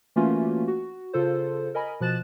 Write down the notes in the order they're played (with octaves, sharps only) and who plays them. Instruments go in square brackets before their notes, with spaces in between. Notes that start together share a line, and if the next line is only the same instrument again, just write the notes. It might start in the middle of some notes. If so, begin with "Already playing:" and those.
[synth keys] E3 A3 A#3 C#4 F4 F#4
F#4
C#3 F4 A4 C5
A#4 D#5 G#5 B5
B2 F3 F#6 A6 E7